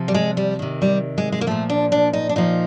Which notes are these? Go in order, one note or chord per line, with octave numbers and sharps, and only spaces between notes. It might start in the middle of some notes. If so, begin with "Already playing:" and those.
Already playing: C3 F3
G3
G#3
G3
C3 D#3
G3
G#3
G#3
A#3
A#2 F3 A3
D4
D4
D#4
D4
A#2 F3 D#4